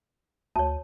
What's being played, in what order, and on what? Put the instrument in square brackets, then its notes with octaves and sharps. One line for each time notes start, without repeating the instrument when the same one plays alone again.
[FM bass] D2 [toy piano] C#5 A5